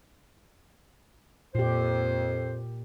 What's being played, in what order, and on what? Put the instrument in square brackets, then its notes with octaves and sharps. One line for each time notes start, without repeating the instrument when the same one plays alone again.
[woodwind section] F2 C5 [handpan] A#2 G4